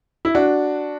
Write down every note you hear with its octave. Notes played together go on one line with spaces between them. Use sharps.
E4
D4 F#4